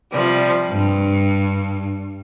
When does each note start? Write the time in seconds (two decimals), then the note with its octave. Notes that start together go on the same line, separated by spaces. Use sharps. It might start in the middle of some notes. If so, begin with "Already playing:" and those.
0.12 C3 F3 G3
0.70 G2